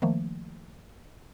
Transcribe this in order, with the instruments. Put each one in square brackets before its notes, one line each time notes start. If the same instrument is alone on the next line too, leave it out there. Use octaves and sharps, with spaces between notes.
[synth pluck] D#3 F3 A3 A#3